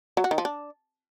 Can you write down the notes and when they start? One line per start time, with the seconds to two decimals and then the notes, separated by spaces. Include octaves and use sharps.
0.17 F#3
0.24 F#4
0.31 D#3
0.38 F3
0.45 D4